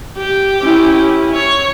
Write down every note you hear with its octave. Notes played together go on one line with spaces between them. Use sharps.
G4
C#4 E4
C#5